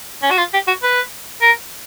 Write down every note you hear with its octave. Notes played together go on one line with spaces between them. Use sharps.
C#4
F#4
F4
G4
F#4
B4
A#4